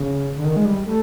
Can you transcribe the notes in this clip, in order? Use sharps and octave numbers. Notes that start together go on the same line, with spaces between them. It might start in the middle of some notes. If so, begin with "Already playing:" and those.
Already playing: C#3
D3
D#3
G#3
G3
A3